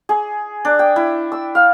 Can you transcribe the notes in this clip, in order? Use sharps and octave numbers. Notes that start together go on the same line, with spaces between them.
G#4
D4
G5
E4
E6
F5